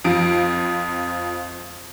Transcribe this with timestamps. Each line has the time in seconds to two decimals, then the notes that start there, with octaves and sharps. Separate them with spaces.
0.05 F2 F3 D7